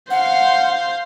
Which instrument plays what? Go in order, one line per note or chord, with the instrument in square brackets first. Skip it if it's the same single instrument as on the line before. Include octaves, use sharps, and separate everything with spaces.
[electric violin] C5 F5 [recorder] F#5